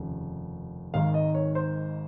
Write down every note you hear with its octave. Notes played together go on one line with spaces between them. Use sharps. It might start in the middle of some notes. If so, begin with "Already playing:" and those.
Already playing: F1 D#2 C#3
G#1 G#2 D#3 F5
D#5
C#5
C5